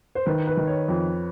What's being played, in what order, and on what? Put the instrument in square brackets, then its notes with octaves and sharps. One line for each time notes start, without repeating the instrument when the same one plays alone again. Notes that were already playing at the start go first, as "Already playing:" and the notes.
[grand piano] C5
[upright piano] D#3 [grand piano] B4
[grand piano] B4
[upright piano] D#3
[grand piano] C#5
[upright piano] F2